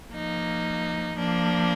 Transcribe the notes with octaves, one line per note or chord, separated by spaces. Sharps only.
F3 A#3 D#4
F3 A#3 D4